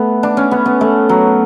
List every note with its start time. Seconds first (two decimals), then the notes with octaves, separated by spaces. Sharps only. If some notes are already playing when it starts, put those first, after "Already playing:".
Already playing: A3 B3
0.23 D4
0.37 C#4
0.51 B3
0.66 B3
0.81 A3
1.09 F#3